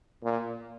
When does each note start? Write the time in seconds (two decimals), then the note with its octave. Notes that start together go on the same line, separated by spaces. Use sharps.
0.24 A#2